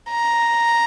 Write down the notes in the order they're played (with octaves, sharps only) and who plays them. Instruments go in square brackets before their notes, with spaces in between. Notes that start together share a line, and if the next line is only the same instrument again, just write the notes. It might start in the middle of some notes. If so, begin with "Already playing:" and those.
[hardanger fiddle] A#5